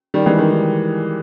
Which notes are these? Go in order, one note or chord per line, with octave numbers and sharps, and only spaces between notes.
D#3 G3
E3 G#3
D#3 G3
D#3